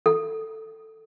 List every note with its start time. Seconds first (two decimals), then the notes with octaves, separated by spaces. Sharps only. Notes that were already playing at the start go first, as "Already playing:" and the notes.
0.06 A4